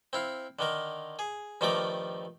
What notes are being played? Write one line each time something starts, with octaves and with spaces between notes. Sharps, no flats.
C4 E4 F5
D3 D#3 A#4
G#4
G2 D#3 F3 A3 A#5 D6